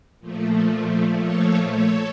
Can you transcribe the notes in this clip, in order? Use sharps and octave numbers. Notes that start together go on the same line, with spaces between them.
A#2 F3 A3
A4 C#5
A4 C#5